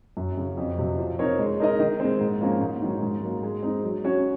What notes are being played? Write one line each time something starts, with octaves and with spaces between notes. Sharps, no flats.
F#2
C#3 F#3 C#4
F2
C3 F#3
F3
C4 D#4 A#4 C#5
G#3
D#4 A#4 D#5
D#3
G#3 C4
G#2
F3 A#3 C#4
G#2
D#3 F#3 C#4
G#2
F#3 A#3
G#3
C4 D#4
F#3
C#4 F#4 C#5